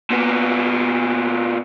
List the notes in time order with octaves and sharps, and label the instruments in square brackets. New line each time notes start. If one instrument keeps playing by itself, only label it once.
[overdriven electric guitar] A#2 B3